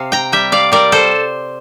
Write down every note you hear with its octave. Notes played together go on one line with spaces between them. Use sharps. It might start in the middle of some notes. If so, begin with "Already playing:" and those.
Already playing: C3 F5
G5 A#5
G3 E5 G5
D5 F5
G3 A#4 D5
A4 C5